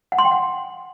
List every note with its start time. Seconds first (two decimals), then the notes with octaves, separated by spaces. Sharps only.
0.12 F#5
0.18 C6
0.25 G5
0.31 F#5